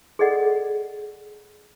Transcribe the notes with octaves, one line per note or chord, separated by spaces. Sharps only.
G#4 A4 D5 D#5 F#5